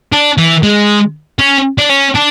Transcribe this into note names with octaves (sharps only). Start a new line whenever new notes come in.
D4
E3
G#3
C#4
D4
C#4
D4